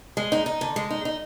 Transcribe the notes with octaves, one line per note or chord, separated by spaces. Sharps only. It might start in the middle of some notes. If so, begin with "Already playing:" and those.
G#3
D#4
D#4
D3
G#3
D#4
D#4